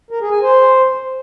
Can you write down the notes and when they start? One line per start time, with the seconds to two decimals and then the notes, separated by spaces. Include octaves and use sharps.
0.11 A#4
0.21 G#4
0.32 G#5
0.42 C5